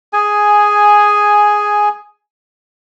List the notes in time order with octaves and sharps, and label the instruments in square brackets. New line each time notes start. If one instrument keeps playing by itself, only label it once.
[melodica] G#4 G#5